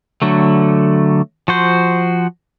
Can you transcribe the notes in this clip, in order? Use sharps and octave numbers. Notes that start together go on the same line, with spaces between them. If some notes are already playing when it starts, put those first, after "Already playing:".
D3 F#3 A3
F3 F#4 C5